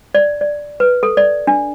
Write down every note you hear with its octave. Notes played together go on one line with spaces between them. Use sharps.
D5
D5
B4
A4
D5
D4